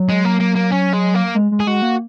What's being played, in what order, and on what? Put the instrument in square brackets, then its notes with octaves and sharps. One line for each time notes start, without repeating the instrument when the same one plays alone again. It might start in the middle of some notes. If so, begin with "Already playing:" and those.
Already playing: [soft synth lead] F#3
[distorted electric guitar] G#3
A#3
A#3
A#3
C#4
G#3
A#3
[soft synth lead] G#3
G#3
[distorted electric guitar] G#4
[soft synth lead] G#3 [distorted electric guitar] F#4
[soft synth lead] A#3